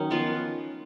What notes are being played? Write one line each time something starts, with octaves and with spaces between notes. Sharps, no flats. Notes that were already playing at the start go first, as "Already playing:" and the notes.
Already playing: D#3 F#3 C#4 D#4
F3 B3 F4 B4